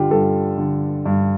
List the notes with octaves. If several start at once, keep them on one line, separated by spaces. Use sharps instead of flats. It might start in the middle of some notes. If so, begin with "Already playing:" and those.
Already playing: G2 D3 F4 G4
G2 A4
D3
G2